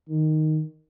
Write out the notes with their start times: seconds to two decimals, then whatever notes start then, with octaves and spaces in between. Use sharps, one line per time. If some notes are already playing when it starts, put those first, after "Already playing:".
0.09 D#3